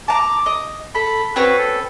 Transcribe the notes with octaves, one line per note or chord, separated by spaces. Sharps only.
A5 A#5 D6
D#5
A4 B5
C4 C#4 F#4 B4
A4